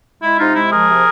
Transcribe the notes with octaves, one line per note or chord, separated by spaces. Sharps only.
G#3 E4
C3 D#4 F4
G#3 E4
F3 G#4 A#4
C3